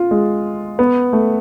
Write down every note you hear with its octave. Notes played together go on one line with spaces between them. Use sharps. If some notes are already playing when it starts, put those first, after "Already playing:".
Already playing: F4
G#3
B3
A3